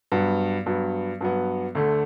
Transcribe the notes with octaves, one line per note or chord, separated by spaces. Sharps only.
G2 F#3 B3
G2 F#3 B3
G2 F#3 B3
D2 D3 A3